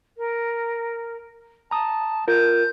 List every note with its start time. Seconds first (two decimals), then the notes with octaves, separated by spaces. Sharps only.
0.18 A#4
1.71 A5 A#5 D#6
2.28 F4 A#4 G6